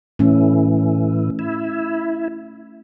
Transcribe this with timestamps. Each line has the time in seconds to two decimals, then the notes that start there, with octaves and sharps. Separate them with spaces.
0.19 A2 E3 A3 C#4
1.39 E4